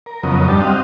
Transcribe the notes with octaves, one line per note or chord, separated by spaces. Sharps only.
A#4
F2 C#3 F#3 B3 A#4 D#5
G2 G3 D4 D#4 A5
C4 F#4 G4 D#5 F5